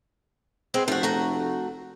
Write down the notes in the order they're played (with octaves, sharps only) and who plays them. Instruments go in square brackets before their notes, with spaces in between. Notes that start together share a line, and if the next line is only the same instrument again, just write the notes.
[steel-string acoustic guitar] G#3 B3 C4
[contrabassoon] F1 [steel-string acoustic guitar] F3 F#4
[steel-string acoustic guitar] A3 F#4 A#5